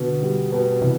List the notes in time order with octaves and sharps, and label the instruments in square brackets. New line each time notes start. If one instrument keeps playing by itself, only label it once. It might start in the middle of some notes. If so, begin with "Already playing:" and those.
Already playing: [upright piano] B2 B3 [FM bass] D3
[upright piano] G3
B2
[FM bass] C3 [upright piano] E3